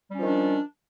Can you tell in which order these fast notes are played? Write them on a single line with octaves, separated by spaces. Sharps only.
G3 C#4 F3 D#3 D4